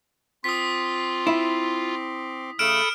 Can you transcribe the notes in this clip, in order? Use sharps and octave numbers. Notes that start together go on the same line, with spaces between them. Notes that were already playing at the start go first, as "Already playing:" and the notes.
C4 F4 C6 D6 D#6 B6
E4
C#3 A3 A4 B5 D#6 F6 D7 E7